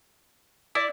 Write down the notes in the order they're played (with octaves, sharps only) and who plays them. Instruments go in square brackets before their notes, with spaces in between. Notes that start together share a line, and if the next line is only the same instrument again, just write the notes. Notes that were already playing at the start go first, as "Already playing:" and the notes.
[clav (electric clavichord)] E4 [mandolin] D5